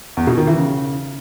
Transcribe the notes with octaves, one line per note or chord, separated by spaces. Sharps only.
E2
B2
D#3
E3
C#3